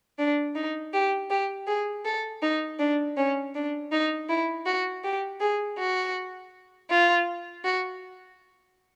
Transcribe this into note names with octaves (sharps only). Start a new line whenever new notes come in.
D4
D#4
G4
G4
G#4
A4
D#4
D4
C#4
D4
D#4
E4
F#4
G4
G#4
F#4
F4
F#4